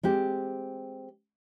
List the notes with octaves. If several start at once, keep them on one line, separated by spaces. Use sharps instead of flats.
G#3 C4 G4